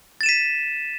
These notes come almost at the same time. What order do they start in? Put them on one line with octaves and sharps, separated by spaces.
A6 E7 D#7 B6